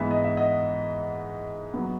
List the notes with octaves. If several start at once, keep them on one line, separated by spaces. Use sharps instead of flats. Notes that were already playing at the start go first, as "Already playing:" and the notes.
Already playing: G#2 E3 B3 E5
D#5
E5
D#5 F#5
F#3 B3